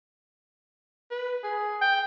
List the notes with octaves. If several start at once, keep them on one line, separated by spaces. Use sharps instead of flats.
B4
G#4
G5